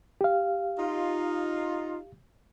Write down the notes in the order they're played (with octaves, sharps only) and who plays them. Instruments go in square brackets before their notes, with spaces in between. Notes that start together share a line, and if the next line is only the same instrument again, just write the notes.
[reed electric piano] G4 F5
[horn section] D#4 F4